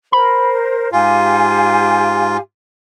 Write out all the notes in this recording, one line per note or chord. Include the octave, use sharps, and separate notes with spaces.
A#4 C5 B5
G#2 F4 G4 F5 G#5